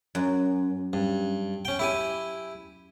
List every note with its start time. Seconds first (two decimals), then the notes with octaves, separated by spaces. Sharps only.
0.15 F#2
0.93 G2
1.65 C#4 G5
1.79 E4 G4 G#5